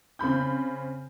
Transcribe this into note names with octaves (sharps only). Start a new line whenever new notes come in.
C#3 C4 B5 G6